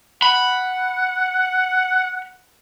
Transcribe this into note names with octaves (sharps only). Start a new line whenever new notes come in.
F#5 B5